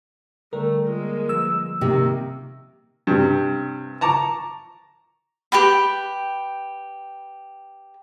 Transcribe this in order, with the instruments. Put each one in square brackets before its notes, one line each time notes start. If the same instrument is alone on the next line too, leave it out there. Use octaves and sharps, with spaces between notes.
[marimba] D3 G3 [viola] A3 [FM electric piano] A#4
[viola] G#3 A#3 [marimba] F4
[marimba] F3 B4 [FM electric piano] E6
[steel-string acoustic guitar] C3 [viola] D#3 A#3
[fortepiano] G2 C3
A5 A#5 C#6 D6
[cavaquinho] G4 B4 G5 B5